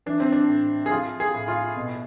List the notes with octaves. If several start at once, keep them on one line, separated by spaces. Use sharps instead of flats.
E3 D4
C4
D4
A2
G#4
F3 F4
G#4
A2
F4
B2